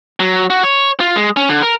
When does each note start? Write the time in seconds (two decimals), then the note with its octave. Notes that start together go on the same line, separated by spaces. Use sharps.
0.20 F#3
0.50 F#4
0.63 C#5
1.00 F4
1.16 G#3
1.36 C#4
1.49 D3
1.62 A#4